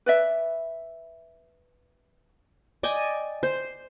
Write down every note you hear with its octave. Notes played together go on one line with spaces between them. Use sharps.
B4 D5 E5
D5 D#5 G5 G#5
C5